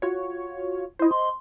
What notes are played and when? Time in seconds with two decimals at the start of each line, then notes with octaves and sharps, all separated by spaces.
0.02 F4 F#4 C#5
0.99 E4 C5 D#5
1.11 C6